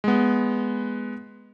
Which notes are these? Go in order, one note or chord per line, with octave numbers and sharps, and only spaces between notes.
G#3 B3